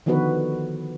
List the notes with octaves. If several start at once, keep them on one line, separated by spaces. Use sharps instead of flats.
D3 D#3 F3 B3 F#4 B4